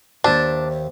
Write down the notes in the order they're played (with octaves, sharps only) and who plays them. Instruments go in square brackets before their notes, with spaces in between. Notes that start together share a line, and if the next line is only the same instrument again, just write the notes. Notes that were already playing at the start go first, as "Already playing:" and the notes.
[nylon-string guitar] D#2 C5 E5 [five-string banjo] D4